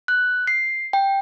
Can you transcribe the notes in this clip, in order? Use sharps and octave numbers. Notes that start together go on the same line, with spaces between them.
F#6
C7
G5